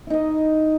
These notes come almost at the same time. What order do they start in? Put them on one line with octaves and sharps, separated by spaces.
E4 D#4 D#5